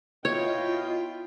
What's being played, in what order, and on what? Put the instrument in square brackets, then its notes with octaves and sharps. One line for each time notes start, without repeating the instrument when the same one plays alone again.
[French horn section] B2 D#5 [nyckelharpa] E4 G5 [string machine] F4 [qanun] C#5